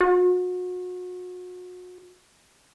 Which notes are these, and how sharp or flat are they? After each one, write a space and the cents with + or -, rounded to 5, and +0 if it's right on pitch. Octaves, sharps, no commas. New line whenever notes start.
F#4 -35